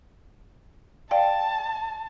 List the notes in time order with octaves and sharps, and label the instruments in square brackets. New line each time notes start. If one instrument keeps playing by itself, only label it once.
[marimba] D5 F5 G5 [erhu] A5